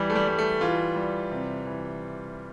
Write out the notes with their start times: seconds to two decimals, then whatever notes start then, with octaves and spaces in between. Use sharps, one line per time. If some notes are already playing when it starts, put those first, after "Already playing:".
Already playing: E3 G3
0.10 A3
0.15 G3
0.27 G3
0.39 A3
0.61 E3 F4
0.96 G3
1.31 C3
1.66 E3